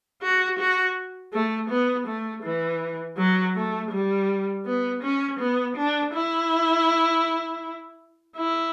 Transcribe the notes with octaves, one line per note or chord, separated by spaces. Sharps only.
F#4
F#4
A3
B3
A3
E3
F#3
A3
G3
B3
C#4
B3
D4
E4
E4